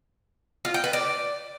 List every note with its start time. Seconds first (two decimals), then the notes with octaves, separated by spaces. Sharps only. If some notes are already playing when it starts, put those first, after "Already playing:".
0.65 F4
0.74 G5
0.84 B4
0.93 D5